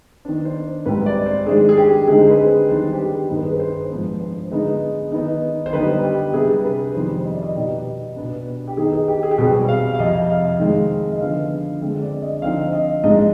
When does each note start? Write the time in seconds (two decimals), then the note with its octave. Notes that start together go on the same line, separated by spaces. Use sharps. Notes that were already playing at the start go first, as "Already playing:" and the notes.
0.25 D#3 B3 D4 C5
0.45 C5
0.86 G#2 G3 C4 B4
1.06 D5
1.26 C5
1.46 D#3 G#3 D4 G#4
1.69 G#4
1.77 G4
2.08 D3 G#3 C4 D#4 G#4
2.21 C5
2.30 B4
2.38 G#4
2.69 D#3 G3 B3 D4 C5
2.93 G4
2.99 G#4
3.29 G2 D#3 B3 D#4 C5
3.37 B4
3.45 G#4
3.52 B4
3.60 C5
3.90 G#2 F3 B3 D4
4.21 C5
4.51 D3 G#3 B3 D#4
5.12 D#3 B3 D#4
5.66 C5
5.73 D3 G3 B3 D#4 B4
6.03 G4
6.34 C3 G3 B3 D4 G#4
6.64 B4
6.95 F2 D#3 G3 B3 C5
7.25 D#5
7.34 D5
7.43 D#5
7.55 B2 B3 D#4 G4
8.16 B2 B3 D4
8.67 G4
8.77 D#3 B3 D#4 G#4
8.93 G#4
9.08 G4
9.23 G#4
9.31 G4
9.38 B2 G3 C4 G#4
9.69 F5
9.94 F5
9.99 F2 C3 F3 D#5
10.30 F5
10.60 D#3 G#3 C4
11.12 D#5
11.21 D3 F3 B3 D4 F5
11.82 D3 G#3 C4
12.01 D5
12.22 D#5
12.42 D3 F3 C4 D#4 F5
12.73 D#5
13.04 G#2 F3 G#3 D4 D#5